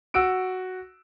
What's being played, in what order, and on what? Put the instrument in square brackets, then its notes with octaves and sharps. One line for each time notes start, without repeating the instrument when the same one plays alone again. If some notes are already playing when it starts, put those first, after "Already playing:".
[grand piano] F#4 E6 D7